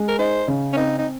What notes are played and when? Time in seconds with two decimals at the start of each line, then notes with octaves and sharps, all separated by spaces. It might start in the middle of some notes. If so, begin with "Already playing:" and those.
Already playing: G#3
0.08 A#4
0.19 D#4 C5
0.48 C#3
0.73 C#4
0.76 C4 D#4
0.98 D#4